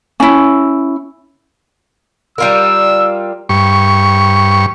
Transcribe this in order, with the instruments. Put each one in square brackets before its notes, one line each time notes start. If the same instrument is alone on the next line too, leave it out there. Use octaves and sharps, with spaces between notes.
[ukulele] C#4 E4
[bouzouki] G3 F4 A#4 [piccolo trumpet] E6
[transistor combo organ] G2 C#6